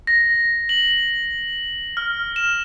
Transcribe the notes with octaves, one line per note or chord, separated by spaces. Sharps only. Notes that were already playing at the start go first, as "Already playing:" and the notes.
A#6
F#7
F6
E7